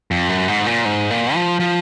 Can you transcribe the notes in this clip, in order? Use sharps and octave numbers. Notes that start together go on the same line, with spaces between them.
F2
F#2
G#2
A#2
G#2
A#2
F3
F3